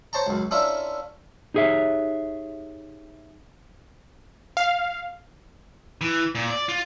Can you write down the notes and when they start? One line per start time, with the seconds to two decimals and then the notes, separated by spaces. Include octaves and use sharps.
0.13 C5 C#5 A5 A#5
0.27 C#2 F#2
0.51 C#4 D4 E4 F4 A#4 E5
1.54 D#4 G4 G#4 C#5 E5
4.57 F5
6.01 E3
6.35 A#2
6.50 D5
6.69 F4